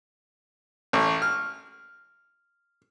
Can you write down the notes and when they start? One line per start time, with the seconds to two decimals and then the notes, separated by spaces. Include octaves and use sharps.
0.93 A1
1.22 F6